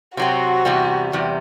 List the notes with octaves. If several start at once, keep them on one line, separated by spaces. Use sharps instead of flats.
C3 F#3 C4 F#4
E2 C3 G3
E2 C3 G3